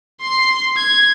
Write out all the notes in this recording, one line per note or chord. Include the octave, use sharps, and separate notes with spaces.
C6 C7
G#6